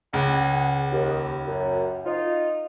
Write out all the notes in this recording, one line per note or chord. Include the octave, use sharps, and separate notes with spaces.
C#2 G#4 F#5
D#2
F#2
D#4 F4